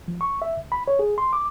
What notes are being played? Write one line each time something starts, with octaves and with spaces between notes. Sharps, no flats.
F3
C#6
E5
C#2
B5
C#5
G#4
C6
D6